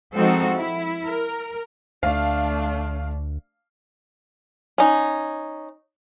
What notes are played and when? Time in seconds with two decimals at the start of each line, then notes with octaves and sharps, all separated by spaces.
0.15 F3 G#3 C4 D#4 F#4 A4
0.57 E4
1.06 A#4
2.03 D2 A3 D4 F5
4.78 C#4 D#4